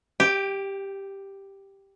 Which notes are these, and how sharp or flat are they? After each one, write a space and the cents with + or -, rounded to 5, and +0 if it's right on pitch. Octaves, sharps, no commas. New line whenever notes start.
G4 +0 G5 +30